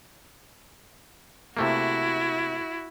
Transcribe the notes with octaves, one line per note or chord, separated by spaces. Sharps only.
C3 A3 A#3 E4 F#4